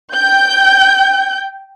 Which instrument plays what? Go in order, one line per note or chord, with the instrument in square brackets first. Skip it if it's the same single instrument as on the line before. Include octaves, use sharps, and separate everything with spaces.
[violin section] G5 G6